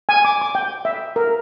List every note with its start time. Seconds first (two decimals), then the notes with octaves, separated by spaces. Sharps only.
0.09 G#5
0.25 D6
0.42 D6
0.55 G5
0.85 E5
1.16 A#4